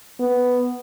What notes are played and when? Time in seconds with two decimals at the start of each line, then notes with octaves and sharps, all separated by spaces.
0.20 B3